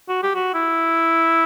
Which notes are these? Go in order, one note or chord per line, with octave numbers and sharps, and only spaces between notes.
F#4
G4
F#4
E4